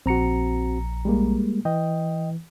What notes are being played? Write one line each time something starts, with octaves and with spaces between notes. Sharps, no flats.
A#1 C4 F#4 A#5 C#7
G3 G#3 A#3
E3 D#5 G5